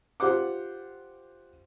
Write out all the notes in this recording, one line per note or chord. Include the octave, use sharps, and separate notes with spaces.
F4 G4 C5 F#5 D6